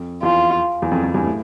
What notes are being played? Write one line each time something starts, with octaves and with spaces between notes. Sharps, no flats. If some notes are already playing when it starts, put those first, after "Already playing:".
Already playing: F2
E2 F4
E2
F2
F2
E2 G2
A2